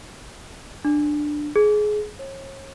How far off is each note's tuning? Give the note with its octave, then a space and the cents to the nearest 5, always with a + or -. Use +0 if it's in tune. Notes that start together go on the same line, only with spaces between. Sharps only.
D4 +10
G#4 +20
C#5 -35